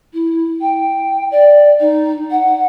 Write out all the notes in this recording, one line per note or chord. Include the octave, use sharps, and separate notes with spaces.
E4
G5
D5
D#4
F#5